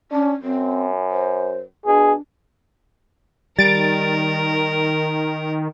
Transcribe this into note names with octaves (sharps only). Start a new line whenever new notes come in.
C#4 D4
F#2 C4
C5
B2 D4 G#4
D#3 G3 A#4 A6 D7